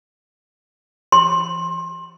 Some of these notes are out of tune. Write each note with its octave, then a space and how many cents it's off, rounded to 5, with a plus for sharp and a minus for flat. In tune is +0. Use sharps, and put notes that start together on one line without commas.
C6 +25